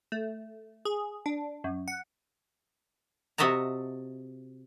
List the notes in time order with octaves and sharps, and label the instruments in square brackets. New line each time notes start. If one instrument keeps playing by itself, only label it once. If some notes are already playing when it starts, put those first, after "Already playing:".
[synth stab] A3
G#4
D4
F#2
F#5
[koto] C3 F#4 D#5 E5 A5 A#5